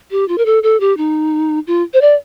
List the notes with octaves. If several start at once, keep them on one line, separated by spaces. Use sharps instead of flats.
G4
F4
A#4
A4
A4
G4
D#4
F4
C5
D5